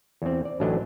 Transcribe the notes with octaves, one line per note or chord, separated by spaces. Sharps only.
E2 C4
D5
A1 D2 D3 F#3 D4 D#5